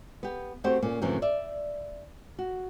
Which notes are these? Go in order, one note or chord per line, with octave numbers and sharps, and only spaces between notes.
B3 G4
A3 C4 F#4 G4 C5
A#2 A#3 C#4
F#2 A2 C3 E3 F3 C#4
D5 E5
F#4